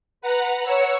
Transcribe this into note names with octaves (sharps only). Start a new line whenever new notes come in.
B4 F#5 A#5
C#5 E6 C#7